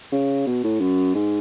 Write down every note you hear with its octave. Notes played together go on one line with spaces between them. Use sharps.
C#3
B2
A2
F#2
G#2